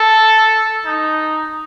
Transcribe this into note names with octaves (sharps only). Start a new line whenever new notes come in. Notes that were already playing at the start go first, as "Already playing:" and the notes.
Already playing: A4
D#4